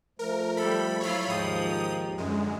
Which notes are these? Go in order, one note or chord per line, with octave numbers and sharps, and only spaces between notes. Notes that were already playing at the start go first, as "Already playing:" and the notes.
F3 A3 A#4
G3 A4 B5
F#3 E4 F4 C#5 B5
D#2 G#2 F3 D#4 G5 D#6
F#2 D3 G#3